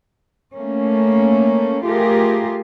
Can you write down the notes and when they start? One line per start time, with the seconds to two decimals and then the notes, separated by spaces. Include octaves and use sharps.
0.54 A3 A#3 C#4
1.84 A3 F4 G4 G#4 A#4